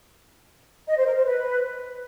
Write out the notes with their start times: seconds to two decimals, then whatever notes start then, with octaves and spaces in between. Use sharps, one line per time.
0.88 D#5
0.97 C5
1.07 A#4
1.16 C5
1.25 B4